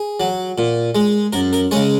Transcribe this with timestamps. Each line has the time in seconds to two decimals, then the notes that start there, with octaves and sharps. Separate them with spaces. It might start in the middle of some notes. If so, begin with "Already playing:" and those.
Already playing: G#4
0.20 F#3
0.58 A#2
0.95 G#3
1.33 F#2 A#4
1.53 A#4
1.71 C#3 G#3 C#5